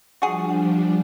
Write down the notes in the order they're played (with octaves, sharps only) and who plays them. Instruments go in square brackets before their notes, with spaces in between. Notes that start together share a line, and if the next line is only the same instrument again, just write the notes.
[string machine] F3 G3 D4 [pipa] F#4 G#4